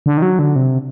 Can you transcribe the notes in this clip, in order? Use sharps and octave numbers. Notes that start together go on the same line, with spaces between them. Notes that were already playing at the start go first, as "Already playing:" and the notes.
D3
D#3
F#3
D3
C3